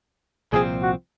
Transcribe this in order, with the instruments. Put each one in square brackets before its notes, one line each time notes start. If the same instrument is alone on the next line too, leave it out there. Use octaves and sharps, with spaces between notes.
[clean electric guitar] C2 A#2 F3 C4 [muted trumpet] G#4
[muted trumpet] F#4